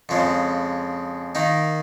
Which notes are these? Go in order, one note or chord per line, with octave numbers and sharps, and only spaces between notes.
F2 C#3 G#3
D#3 A#3 D#4